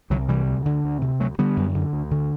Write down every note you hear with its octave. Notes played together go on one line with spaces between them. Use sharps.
C2 D3 F#3
C3 E3 G3
D2
D3
D2
C3
D2 F#3 A3
D3 G3 B3
F#2
D3
D2
D3